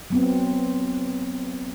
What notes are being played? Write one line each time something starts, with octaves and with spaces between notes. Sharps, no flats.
F#3 B3 C4